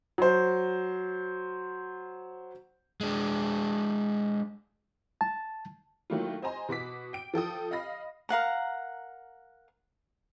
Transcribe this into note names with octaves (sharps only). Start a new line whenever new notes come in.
F#3 C5
G#3 D4
A5
D#3 F#3 A3 A#3 E4 F4
C5 D#5 G#5 A#5 C6
B2 F#4 D6 B6
G5 D7
F3 A4 G5 D#6
D#5 F5 B5 A#6
A#4 F5 F#5 A#5